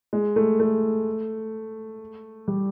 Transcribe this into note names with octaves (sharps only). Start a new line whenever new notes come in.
G#3
A3
A3
G3